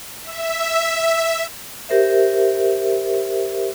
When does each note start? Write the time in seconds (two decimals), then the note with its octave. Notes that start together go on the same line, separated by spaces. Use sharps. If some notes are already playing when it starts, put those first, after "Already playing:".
0.22 E5
1.89 G4 A#4 C5 E5